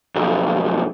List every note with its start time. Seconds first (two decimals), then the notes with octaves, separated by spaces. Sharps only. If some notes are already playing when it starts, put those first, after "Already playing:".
0.15 B1 F2